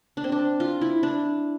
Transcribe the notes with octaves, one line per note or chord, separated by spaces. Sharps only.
D4
C4
D4
F4
E4
D4